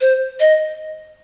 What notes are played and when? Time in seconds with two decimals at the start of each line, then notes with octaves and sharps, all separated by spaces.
0.01 C5
0.40 D#5